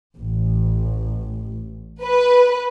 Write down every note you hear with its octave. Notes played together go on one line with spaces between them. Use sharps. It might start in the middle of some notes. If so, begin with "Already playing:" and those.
A1
B4